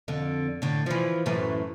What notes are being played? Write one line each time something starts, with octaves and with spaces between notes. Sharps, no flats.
F2 D3
A2 D3
E3 F3
F#2 A2 E3